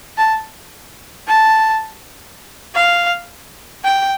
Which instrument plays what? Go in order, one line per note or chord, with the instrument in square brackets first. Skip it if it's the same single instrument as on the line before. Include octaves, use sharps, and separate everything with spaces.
[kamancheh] A5
A5
F5
G5